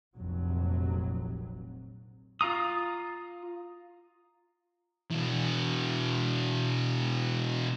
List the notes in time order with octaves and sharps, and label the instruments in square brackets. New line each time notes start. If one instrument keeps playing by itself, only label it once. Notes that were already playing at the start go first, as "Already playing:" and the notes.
[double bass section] F1 A#1 F2 F#3
[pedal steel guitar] F4 F5 A#5 D#6
[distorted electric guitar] B2 E3